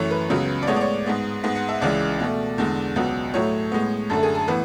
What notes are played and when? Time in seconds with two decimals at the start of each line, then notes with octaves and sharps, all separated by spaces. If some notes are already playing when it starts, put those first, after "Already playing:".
Already playing: F#2 E3 A3 C#5
0.11 B4
0.30 C#2 C#3 F#3 B3
0.62 D5
0.67 A2 G#3 B3 C#5
0.76 D5
0.81 C#5
1.06 G#2 G#3 B3
1.44 G#2 G#3 B3
1.55 F#5
1.69 E5
1.81 C#2 C#3 E3 G#3 D5
2.20 B2 A3
2.58 E2 D3 G#3
2.96 C#2 B2 F#3 B3
3.34 A2 F#3 A3 C#5
3.72 A2 G#3 B3
4.10 F#2 D3 A3 A4
4.23 G#4
4.35 A4
4.48 A2 E3 B3 B4